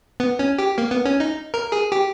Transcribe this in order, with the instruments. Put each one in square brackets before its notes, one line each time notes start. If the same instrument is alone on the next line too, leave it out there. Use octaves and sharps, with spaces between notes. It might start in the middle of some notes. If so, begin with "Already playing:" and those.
[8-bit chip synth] B3
C#4
G4
A#3
B3
C#4
D#4
A#4
G#4
G4